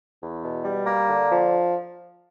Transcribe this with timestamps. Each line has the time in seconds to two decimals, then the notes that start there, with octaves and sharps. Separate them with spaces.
0.21 E2
0.43 B2
0.64 G3
0.87 A#3
1.08 D3
1.30 F3